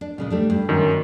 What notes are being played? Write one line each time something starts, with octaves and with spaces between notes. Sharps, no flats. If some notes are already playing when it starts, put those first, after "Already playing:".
D4
A#2 C#3 G#3
G3 A3 D4
G2
F#2 D#3